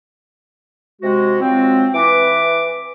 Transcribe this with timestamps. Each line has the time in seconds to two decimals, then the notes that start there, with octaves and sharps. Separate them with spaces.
1.02 C3 G#3 F#4
1.41 F3 F#3 G#3 C4
1.94 E3 B4 D6